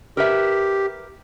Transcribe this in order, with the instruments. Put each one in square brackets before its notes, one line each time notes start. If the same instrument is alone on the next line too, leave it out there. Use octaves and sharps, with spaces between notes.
[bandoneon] G4 [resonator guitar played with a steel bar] A#4 B4 E5